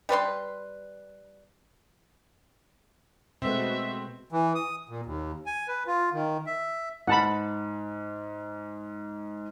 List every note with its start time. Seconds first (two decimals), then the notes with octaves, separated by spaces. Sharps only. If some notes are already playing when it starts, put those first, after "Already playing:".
0.09 G3 B4 C5 C6
3.42 B2 G#3 A3 B3 C4 F#4 B4 E5
4.32 E3
4.55 D#6
4.89 A#2
5.06 D#2
5.46 G#5
5.68 B4
5.87 F4
6.13 D#3
6.46 E5
7.07 G#2 F#5 A5 B5